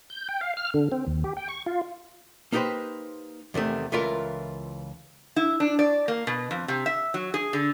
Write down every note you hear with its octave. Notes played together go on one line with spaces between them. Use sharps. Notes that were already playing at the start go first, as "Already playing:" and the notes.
G6
G5
F5
F6
D3
C4
D#2
G4
G5
C#6
F4
A#3 D#4 G4 A4 B4 C5
E2 C3 D#3 A3
C#2 E3 E4 F4 A4 A#4
E4
D4
D5
A#3
B2
F2
C3
E5
F#3
G#4
D3